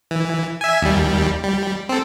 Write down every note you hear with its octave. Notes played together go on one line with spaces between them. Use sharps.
E3
E5 G#5
D#2 G3
G3
C4 A4